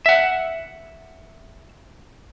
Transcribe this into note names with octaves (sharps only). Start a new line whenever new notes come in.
E5 F#5